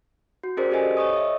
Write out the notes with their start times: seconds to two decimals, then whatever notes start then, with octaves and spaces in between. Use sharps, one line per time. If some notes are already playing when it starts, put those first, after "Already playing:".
0.43 F#4
0.57 C#4 F#4 G#4 A#4 C5 D5
0.71 G4 A4 C5 D#5 G#5
0.97 C#5 D#5 C#6 D#6
1.13 E5 D#6